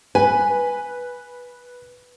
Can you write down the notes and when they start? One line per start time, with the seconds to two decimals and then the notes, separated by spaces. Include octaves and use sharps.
0.15 B4 G#5